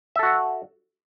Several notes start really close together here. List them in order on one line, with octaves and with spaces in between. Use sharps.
E5 A4 F#4 F#5